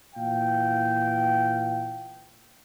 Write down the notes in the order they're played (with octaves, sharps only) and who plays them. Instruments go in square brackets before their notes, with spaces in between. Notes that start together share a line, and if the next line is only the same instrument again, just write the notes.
[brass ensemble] A#2 E3 F5 G5